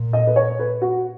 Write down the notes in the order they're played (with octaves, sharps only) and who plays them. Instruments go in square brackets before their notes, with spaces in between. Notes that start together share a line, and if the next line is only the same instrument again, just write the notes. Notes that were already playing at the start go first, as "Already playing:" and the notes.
Already playing: [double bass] A#2
[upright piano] D#5
B4
C#5
B4
F#4